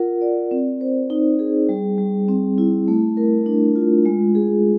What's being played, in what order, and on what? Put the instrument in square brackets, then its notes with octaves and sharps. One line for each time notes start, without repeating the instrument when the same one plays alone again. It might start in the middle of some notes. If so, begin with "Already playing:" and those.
Already playing: [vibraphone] F4 A#4 F#5
D5
C4
C5
D#4
G#4
G3
G3
C4
E4
A3
A#4
D4
F4
G#3
G#4